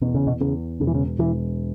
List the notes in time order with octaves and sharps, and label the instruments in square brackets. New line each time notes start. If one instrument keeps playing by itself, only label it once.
[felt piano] E2 [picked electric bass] B2
[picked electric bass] C#3
B2
[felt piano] E2 [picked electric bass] C#3
[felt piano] E1 [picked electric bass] C#3
[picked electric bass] E3
C#3
[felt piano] E1 [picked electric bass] E3